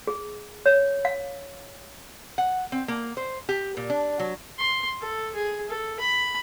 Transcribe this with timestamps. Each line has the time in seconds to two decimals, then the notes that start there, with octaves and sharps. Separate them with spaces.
0.07 G#4
0.66 C#5
1.05 F5
2.38 F#5
2.72 C4
2.88 A#3
3.17 C5
3.49 G4
3.77 A#2
3.90 D4
4.20 F#3
4.58 C6
5.02 A4
5.35 G#4
5.70 A4
6.00 B5